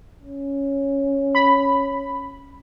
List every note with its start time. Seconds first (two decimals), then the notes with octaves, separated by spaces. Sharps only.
0.22 C#4
1.35 B5